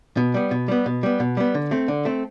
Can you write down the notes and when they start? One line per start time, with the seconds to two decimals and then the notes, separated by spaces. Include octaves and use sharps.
0.17 B2
0.34 G3 B3
0.51 B2
0.68 G3 B3
0.86 B2
1.03 G3 B3
1.20 B2
1.37 G3 B3
1.55 D3
1.71 A3 C4
1.88 D3
2.05 A3 C4